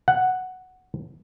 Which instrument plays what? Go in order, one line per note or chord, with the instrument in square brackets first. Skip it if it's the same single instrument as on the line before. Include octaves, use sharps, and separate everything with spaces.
[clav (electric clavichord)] F#5